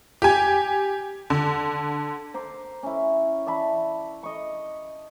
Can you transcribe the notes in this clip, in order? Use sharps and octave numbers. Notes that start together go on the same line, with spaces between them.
G4 G#5
D3
C5 A#5 D6
C#4 E4
D5 E5 A5 B5
D#5 C#6